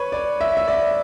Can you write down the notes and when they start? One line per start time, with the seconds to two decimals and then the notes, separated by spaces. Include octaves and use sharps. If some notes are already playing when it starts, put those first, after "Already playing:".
Already playing: B4 C#5
0.12 D5
0.41 E5
0.57 E5
0.68 D5